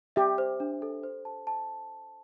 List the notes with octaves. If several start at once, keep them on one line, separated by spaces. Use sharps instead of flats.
G4 E5
C5
D4
A4
C5
A5
A5